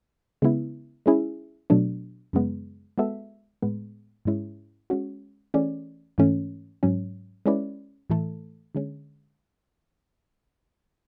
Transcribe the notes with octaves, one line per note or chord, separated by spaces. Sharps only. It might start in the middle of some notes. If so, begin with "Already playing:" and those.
C#3 G#3 B3 E4
G#3 C#4 E4 G#4
B2 F#3 A3 D4
F#2 C#3 G#3 B3
G#3 B3 F#4 A4 E5
A2 G#3 B3
G#2 G#3 C#4 E4
G#3 C#4 F#4
E3 A3 C#4 G#4 D5
G#2 E3 A3 C#4
G#2 F#3 C#4
G#3 C#4 E4 B4 D5
A2 E3 A3 E4 A4
D3 G#3 C#4